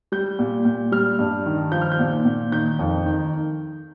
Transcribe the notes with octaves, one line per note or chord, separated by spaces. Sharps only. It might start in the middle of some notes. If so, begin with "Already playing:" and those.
G3 G6
A#2
A#2
G3 F6
G2
D#3
F3 G6
F6
G6
A#2
A#2
D#3 G6
F2
D#3